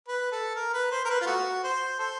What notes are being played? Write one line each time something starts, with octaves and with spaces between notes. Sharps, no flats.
B4
A4
A#4
B4
C5
A#4
B4
F4
A3 B3 F#4
C5
A4 C5